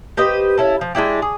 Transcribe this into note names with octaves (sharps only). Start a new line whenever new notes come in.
G4 B4 C5 D#5
C#4 E4 A4
F3
G#3 D4 E4 G4
G#4